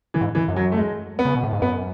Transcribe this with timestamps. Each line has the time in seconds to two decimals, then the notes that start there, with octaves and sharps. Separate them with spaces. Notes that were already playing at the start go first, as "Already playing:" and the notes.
0.14 E3
0.21 G#2
0.35 E3
0.48 F#2
0.56 F#3
0.72 A3
0.77 G#3
1.19 B3
1.25 C#3
1.35 B2
1.44 A2
1.53 G#2
1.62 F#2 B3